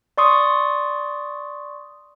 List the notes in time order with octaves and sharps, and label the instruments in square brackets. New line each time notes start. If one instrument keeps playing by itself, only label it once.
[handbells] D5 C6 C#6 D#6